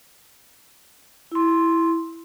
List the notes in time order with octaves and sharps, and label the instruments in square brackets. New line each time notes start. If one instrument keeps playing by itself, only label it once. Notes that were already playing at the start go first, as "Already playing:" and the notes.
[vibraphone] E4 C6